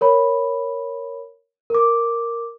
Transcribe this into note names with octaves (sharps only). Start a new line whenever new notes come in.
A#4 C#5 B5
A#4 D6